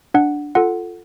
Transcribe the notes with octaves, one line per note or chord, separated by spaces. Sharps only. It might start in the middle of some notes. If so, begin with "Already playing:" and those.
D4 F#5
F4 A4 F#5